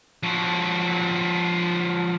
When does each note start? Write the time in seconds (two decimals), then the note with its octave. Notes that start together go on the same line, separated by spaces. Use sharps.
0.23 F3 F#3